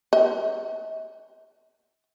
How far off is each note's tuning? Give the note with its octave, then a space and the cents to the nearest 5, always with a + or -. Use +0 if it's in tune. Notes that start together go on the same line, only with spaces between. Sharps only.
D#5 +45